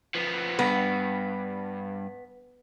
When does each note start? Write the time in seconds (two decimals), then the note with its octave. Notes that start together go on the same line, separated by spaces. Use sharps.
0.15 F3 B3
0.59 G2 B3